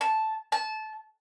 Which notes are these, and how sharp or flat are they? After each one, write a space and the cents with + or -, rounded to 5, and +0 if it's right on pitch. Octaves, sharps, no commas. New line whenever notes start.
A5 -5
A5 -20